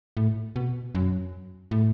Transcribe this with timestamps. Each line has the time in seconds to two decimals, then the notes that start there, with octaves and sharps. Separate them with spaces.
0.17 A2
0.56 B2
0.95 F#2
1.71 A2